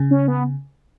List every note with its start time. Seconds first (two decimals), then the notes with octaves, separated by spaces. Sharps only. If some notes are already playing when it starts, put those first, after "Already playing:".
Already playing: C#3
0.11 C#4
0.28 B3